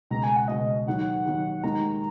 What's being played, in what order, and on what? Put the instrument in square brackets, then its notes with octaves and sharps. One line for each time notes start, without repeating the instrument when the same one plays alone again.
[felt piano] C#2 B2 G#3 [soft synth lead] A#5
[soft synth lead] G#5
F#5
[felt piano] C#2 B2 G#3 [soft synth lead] D#5
[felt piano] D#2 D#3 F#3 [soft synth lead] F#5
[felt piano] D#2 D#3 F#3
[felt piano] D#2 D#3 G#3 [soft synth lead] A#5